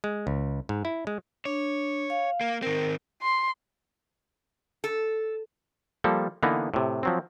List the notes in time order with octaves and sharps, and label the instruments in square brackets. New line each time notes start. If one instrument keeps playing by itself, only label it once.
[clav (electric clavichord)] G#3
C#2
G#2
E4
G#3
[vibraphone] D4 [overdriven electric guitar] C#5
[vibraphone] F5
[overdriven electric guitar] A#3
[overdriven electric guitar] D#3 C4 [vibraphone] A#4
[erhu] C6
[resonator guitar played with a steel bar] A4
[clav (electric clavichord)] F3 G3 A#3 A4
D3 E3 A#3 B3 D#4
A2 C3
F3 F#3 C4